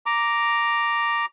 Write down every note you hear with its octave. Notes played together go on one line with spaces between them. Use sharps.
A#5 D6